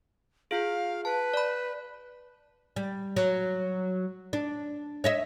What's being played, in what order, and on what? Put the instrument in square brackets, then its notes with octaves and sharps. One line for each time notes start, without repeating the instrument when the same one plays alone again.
[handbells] F4 G#4 [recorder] F5
[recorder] B4 [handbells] A5
[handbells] D5 B5
[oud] G3
F#3
D4
C#5 D#5 E5